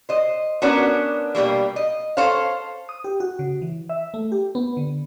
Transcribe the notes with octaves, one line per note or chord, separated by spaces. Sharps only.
C5 D#5
B3 C#4 D4 F#4 A#4
B2 G3 A3 A#3
D#5
A4 C5 C#5 F5
D#6
G4
F#4
C#3
E3
E5
A3
G4
B3
D3